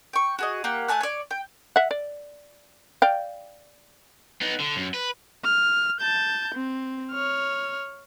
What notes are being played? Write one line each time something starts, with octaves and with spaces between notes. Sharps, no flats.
G5 C#6
F#4 G#4 D#5
A#3 G4 F#5
A3 G#5 A5 F#6
C#5 D5
G5
E5 F#5
D5
D5 F5 G5
B3 D#4
D3
F#2
B4
F6
A5 G6
C4
C#5 F6